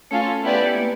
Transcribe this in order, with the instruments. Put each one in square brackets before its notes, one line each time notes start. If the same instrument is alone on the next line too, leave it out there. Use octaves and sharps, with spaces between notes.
[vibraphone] A3 [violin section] C#4 F4 A4
[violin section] B3 E4 G4 B4 D5
[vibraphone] A3
A#3